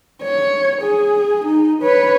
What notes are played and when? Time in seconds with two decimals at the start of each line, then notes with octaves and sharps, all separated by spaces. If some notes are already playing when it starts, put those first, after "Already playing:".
0.22 C#5
0.82 G#4
1.46 D#4
1.82 B4 C#5